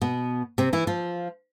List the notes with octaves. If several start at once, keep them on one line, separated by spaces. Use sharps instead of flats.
B2 B3
C3 C4
E3 E4
F3 F4